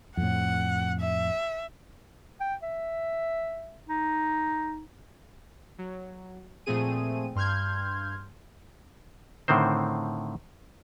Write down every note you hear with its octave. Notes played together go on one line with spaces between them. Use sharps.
F2 A2 F#5
E5
G5
E5
D#4
F#3
A#2 F3 A3 C4 G#4 D#7
G2 C6 F6 G6 G#6
A2 D3 D#3 C4 C5